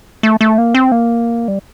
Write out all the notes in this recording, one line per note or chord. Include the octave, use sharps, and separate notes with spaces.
A3
A3
A#3
C4
A#3
G3